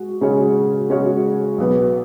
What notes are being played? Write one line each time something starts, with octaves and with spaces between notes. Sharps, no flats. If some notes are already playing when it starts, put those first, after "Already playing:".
Already playing: G#3 F#4
C#3 G#3 C#4 F#4 C#5
C#3 G#3 C#4 F#4 C#5
B1 B2 B3